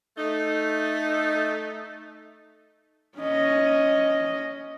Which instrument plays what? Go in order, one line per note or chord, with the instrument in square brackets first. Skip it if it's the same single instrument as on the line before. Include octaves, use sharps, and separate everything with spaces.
[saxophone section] A3 D#4
[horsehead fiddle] C#4 D#5